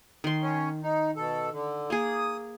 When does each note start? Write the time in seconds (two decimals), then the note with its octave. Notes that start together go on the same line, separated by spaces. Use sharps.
0.24 D#3 C6
0.42 C#4
0.83 D#4
1.16 B2 A4
1.53 D3
1.90 A#3 G#4 D#6